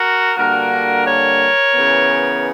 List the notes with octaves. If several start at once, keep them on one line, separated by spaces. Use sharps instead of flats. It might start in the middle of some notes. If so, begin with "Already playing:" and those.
Already playing: F#4 A#4
G2 D3 A#3 F#4 A#4
A#4 C#5
C#3 E3 B3